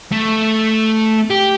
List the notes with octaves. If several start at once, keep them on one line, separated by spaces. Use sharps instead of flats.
A3
G4